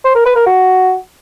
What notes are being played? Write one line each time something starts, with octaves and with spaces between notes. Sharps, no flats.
C5
A#4
B4
A#4
F#4